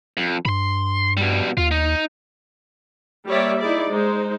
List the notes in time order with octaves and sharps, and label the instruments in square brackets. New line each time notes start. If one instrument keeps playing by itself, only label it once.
[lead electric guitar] F2
[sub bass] G2 [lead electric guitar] B5 C6
[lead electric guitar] B2 G3
[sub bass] D#2 [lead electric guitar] F4
[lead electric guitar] D#4
[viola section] G3 A#3 C#5 D5 E5
D#4 E4 G#4 D5
G#3 D#4 C5